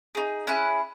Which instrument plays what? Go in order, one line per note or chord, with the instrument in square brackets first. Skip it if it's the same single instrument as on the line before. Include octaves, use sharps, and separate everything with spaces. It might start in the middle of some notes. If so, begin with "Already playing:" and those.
[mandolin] D#4 G#4
C#4 E4 G#4 F#6